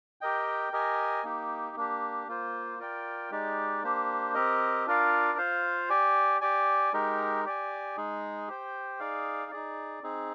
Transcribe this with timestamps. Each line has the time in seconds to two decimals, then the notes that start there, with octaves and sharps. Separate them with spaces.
0.21 G4 A#4 D#5 G5
0.73 G4 A#4 D#5 G#5
1.24 A#3 D#4 G4
1.76 A#3 D4 G4
2.28 A#3 F4 C5
2.79 F4 A#4 D5 G5
3.31 G#3 D#4 G4 D5
3.83 A#3 D4 G4 C5
4.34 C4 G4 A#4 D#5
4.86 D4 F4 A#4 D5 F5
5.38 F4 C5 F5
5.90 G4 D5 G#5
6.41 G4 D5 G#5
6.93 G#3 D#4 G4 A#4
7.45 G4 D5 G#5
7.97 G#3 D#4 G#4
8.48 G4 C5 G5
8.99 D#4 G#4 D5 F5
9.51 D#4 G#4 D5
10.03 C4 D#4 G#4